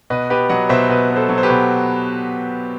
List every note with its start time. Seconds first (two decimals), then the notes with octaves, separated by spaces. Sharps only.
0.10 B2 B4 D#5
0.30 B3 G4 B4
0.50 F#3 D#5 F#5
0.69 B2 C5 E5
0.89 B2 B4 D#5
1.10 B3
1.16 A4 C5
1.29 F#3
1.38 C5
1.43 G4 B4
1.50 B2